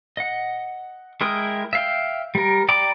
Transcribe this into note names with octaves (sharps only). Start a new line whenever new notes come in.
D#5 F#5
G#3 E4 A#4 G5 D#6
E5 F5 G5
G3 A#4
D5 G5 A#5 B5 D6